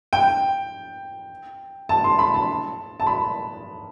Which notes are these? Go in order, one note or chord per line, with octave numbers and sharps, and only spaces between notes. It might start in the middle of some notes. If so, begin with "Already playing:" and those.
G5
A5
C6
B5
A5
A5
B5